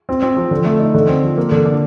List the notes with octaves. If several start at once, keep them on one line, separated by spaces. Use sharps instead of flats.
C4
C4
F3
D3
A3
D#4
D3
C4
F3
A#3
D3
D4